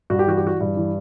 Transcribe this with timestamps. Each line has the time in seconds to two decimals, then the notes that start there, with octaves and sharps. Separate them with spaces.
0.10 G2 F#4
0.19 G4
0.27 E3 F#4
0.37 G4
0.43 E3 F#4
0.61 G2
0.77 E3